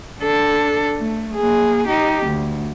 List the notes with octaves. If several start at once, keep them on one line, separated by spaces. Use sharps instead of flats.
D4 A4
A3
A#3 G#4
D#4 G4
D2